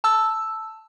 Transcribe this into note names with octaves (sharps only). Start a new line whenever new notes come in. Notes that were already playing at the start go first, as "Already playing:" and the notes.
A5 E6